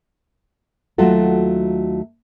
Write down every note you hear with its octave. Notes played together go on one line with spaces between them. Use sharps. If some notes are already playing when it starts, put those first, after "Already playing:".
D#2 F#3 A3 F4 F#4 A4